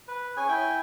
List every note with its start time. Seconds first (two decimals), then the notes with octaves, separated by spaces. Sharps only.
0.08 B4
0.37 C#4 G#4 G#5
0.49 E4 G5 G#5